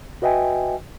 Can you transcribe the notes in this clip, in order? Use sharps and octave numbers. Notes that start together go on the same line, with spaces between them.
F#4 B4 D#5 E5 G5 G#5